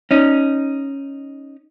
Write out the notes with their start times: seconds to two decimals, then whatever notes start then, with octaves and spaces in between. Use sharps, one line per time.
0.11 C#4 D#4